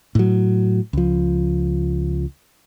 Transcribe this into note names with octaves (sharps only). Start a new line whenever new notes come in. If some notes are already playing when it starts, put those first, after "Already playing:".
A2 F#3
C#2 F3